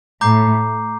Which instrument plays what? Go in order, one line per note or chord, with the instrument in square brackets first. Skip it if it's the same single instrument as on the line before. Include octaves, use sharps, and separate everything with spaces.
[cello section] A2 [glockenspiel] A#5 D6 G6 C7